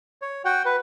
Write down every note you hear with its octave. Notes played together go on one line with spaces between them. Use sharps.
C#5
F#4 F#5 G5
B4